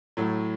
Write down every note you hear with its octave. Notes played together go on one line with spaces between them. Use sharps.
A2 F#3 A3